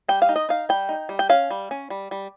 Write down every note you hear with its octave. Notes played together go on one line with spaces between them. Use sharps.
G3 G5
F5
D#4
D#5
D#4 F5
G3 G5
D#4
G3
G5
C#4 F5
G3
C#4
G3
G3